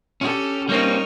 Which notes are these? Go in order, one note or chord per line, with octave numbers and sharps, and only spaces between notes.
C#4 G4 A4
G3 A#3 C4 D#4 A#4 C#5